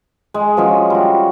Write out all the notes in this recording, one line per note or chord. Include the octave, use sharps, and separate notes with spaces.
G#3
F3 F#3 G#3 C#4
G3 F#4